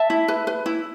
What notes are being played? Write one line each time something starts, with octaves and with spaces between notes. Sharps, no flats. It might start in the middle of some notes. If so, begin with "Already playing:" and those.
Already playing: E5 A5
E4
B4
B4
E4